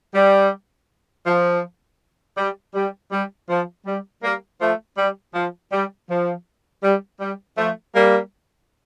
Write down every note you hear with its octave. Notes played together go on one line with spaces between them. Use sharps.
G3
F3
G3
G3
G3
F3
G3
G3 A#3
F3 A3
G3
F3
G3
F3
G3
G3
F3 A3
G3 A#3